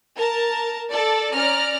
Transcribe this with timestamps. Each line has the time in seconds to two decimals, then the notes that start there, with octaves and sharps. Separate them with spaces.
0.18 A#4 A5 A#5
0.91 A4 D5 A5
1.34 C#4 D5 A#5 F6